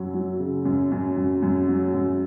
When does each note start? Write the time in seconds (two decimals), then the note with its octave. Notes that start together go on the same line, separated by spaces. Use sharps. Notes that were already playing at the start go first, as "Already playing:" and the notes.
Already playing: F#2 F#3
0.14 F#3
0.39 C#3
0.65 F#2
0.92 F#2
1.16 F#2
1.42 F#2
1.68 F#3
1.94 F#2